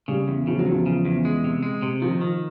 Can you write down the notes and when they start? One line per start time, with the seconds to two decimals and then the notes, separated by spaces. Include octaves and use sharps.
0.08 C#3 G3
0.28 E2
0.47 C#3 F3
0.59 F#3
0.67 E2 F3
0.86 C#3
1.05 E2
1.25 G#3
1.44 C3
1.63 G#3
1.82 C3
2.02 D#3 F3
2.21 D#3